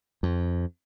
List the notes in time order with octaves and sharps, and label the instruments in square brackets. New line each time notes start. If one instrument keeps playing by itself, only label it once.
[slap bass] F2